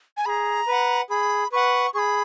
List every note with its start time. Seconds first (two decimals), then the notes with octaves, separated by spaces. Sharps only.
0.17 G#5
0.26 G#4 A#5 B5
0.68 B4 F#5
1.10 G#4 B5
1.52 B4 F#5 C#6
1.94 G#4 B5 C#6